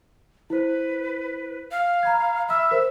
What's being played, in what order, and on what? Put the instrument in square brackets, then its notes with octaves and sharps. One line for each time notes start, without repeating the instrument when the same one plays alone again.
[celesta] E4 C5 [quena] B4
[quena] F5
[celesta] A#5 B5 G#6
[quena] E5 [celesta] B5 E6 F6
[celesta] A#4 C5